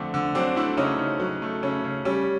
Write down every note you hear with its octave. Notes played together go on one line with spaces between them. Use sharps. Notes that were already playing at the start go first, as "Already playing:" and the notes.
Already playing: D3 F3 A3 C4 D4
D3
F#3 C4 D4
A3 D4 E4
C#3 C#4 D#4
C#3
F#3
A3
C#3 C#4
C#3
G3 C#4